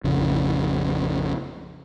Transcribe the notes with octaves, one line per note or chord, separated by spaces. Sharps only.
A#1 F2 C#3